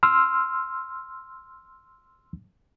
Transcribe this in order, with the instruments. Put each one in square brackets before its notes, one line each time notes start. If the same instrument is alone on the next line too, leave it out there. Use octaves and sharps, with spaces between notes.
[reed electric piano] C6 E6 F6